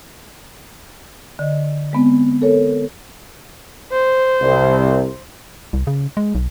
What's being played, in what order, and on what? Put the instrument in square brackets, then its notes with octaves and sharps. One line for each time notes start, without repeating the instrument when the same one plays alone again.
[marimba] D3 D#5
G#3 B3 C4
A4 A#4 C#5
[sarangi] C5
[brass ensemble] C2 C3
[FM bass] C2
C#3
G#3
B1